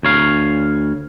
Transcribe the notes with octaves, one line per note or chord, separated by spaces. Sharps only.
D2 C#5 F5